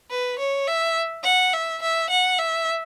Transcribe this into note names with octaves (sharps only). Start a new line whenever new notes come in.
B4
C#5
E5
F#5
E5
E5
F#5
E5